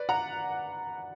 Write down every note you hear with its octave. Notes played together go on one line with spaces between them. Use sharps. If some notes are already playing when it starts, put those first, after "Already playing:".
Already playing: B4 D5
F#5 A#5